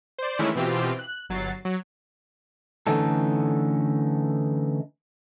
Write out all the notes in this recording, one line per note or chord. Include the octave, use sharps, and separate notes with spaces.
C5 D5
D#3 E3 G#3 A3 C#4 E4
B2 E3 C4 F4 G4
F#6
G1 F#3 A6 C7
F#3
D3 E3 A3 C#4 D#4 A4